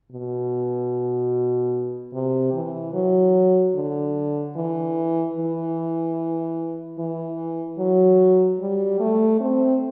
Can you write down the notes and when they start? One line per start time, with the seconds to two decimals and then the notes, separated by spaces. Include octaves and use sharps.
0.12 B2
2.14 C3
2.54 E3
2.94 F#3
3.75 D3
4.56 E3
5.37 E3
6.99 E3
7.78 F#3
8.60 G3
9.00 A3
9.40 C4